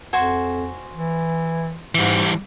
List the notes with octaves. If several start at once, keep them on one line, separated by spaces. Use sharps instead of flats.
F2 F#4 C5 G#5
E3
G#2 E3 G3